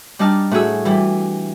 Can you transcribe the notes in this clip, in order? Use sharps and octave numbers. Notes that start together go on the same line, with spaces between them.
G3 D4 D#4 A5 F6
A2 F#4 G#4 E6
E3 G3 E4